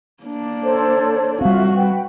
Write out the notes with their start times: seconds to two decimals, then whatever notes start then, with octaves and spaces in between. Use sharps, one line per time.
0.23 A#3 D4
0.63 A4 C5 C#5
1.41 G3 C4 F4 F#4 E5 F5
1.75 B4 F#5 G5